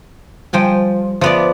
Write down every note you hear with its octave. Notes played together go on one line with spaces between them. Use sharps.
F3 G3 G5 G#5
F3 B3 D5 E5